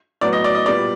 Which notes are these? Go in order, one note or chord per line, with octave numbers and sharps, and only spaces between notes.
A2 F#3 B3 D5
D#5
D5
D#5
A#2 G3 B3 D5